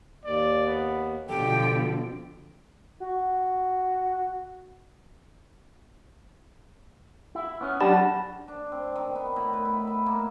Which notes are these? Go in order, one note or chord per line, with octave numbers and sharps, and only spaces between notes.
D#2 D5
B3
B2 D3 F3 G4 A4 G5
F#4
E4
B3 C#4
F#3 D4 G4 F#5 A5 B5
D4
C4
D#3
B3
A2
B4
E4
E5
A#3